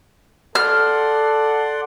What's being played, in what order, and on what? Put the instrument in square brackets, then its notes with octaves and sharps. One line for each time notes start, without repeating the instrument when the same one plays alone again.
[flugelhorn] A4 [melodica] D5 F#5 C6 [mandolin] F6